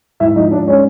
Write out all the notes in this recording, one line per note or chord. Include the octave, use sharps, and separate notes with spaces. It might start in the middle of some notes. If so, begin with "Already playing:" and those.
G#2 E4 E5
F3 D#4 D#5
G#2 D4 D5
G#3 C#4 C#5